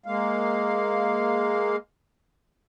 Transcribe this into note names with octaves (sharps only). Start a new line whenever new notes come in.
G#3 A#3 F5